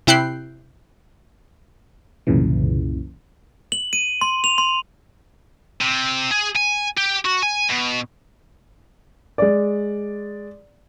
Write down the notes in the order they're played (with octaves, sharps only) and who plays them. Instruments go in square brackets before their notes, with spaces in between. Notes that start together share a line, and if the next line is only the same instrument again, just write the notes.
[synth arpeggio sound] C3 E4 G5 F#6 C7
[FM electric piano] C2 F#2 A#2 C#3 E3
[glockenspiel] F#7
D#7
C6
F7
C6
[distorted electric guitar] C3
G#4
G#5
G4
F#4
G#5
B2
[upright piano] G#3 D5